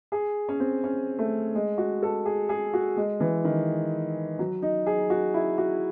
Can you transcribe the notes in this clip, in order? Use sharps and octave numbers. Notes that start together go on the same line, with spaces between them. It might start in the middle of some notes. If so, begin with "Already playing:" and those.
G#4
C#4
C4
C#4
A3
G#3
F#4
A4
G#4
G#4
F#4
G#3
E3
D#3
F#3
D#4
G#4
F#4
E4
F#4